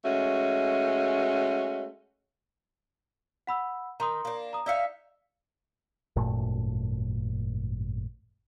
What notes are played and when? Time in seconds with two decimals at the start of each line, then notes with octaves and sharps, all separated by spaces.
0.05 G#3 A3 C#4 F#4
3.47 F#5 B5 E6
4.00 D#3 A#5 C6 D#6
4.25 A#3 D4
4.53 A#5 D#6
4.66 D#4 D5 E5 F5 E6 C#7
6.16 G#1 F#2 A#2 A3